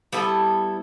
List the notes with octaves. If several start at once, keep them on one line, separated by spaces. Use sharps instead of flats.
G3 B3 E4 A4